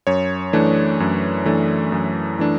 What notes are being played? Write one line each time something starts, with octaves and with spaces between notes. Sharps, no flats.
F#2 C#5
E3 A3 D4
F#2
E3 A3 D4
F#2
E3 A3 D4